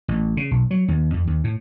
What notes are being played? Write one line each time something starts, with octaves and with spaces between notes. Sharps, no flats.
A1
C#3
B1
F#3
D#2
F2
D#2
A2